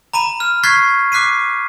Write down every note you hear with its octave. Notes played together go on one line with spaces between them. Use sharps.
A#5 B5 D#7
F6
C#6 F#6 G#6 A6 B6 C7
D6 F#6 B6 C7 D#7